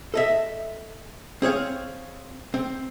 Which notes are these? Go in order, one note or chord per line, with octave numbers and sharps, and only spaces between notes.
A4 D#5 E5
C4 G#4 C#5 F5
C4